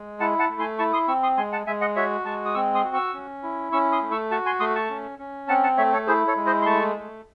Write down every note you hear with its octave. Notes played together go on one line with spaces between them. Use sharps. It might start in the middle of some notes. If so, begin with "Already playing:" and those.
Already playing: G#3
E4 F#5 A5
F#5 A5
A3
G#5 C6
E4 A5 C#6
C6 D#6
C4 C#6 E6
C6 D#6
G#3 G#5 C6
F#5 A5
G#3 E5 G#5
D#5 F#5
F#4 C#5 E5
G#3 A5 C#6
D#6
C4 C#6 E6
C6 D#6
F#4
C#6 E6
C#4
E4
C#4 C#6 E6
C6 D#6
A3
C#6 E6
F#4 A5 C#6
G#5 C6
A3 C6 D#6
A5 C#6
C#4
C#4
C4 F#5 A5
F#5 A5
A3 C#5 E5
A4 C#5
E4 G#4 C5
A4 C#5
G#3
C5 D#5
C6
A3 A5 C#6
A3